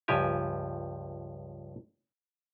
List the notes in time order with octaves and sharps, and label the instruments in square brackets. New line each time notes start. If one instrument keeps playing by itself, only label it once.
[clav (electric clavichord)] C#2 G2 F3 G4 G#5